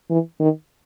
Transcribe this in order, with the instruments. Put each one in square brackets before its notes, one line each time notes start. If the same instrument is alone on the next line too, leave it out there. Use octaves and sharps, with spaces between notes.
[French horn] E3
D#3